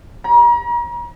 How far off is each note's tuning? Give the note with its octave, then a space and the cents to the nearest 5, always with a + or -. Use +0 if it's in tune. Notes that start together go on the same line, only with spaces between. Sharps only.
A#5 +40